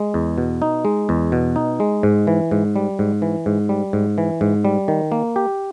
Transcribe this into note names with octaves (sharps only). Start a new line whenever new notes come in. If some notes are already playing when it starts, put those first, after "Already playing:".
Already playing: G#3
E2
B2
D#4
G#3
E2
B2
D#4
G#3
G#2
E3
G#2
G3
G#2
E3
G#2
G3
G#2
E3
G#2
G3
D#3
A#3
G4